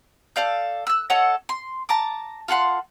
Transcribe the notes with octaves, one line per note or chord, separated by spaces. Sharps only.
A4 D5 F5 G6
E6 F#6
A4 C#5 D#5 F#5
C6
A5 A#5 D6
F4 A4 F#5 C6